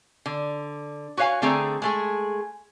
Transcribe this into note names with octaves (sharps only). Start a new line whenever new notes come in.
D3
F#4 B4 C#5 F5 G#5
D3 A3 C4 G#4 A#5
G#3 A3 G#4